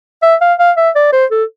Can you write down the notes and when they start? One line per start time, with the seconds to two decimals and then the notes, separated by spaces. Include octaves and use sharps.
0.23 E5
0.41 F5
0.59 F5
0.77 E5
0.96 D5
1.13 C5
1.31 A4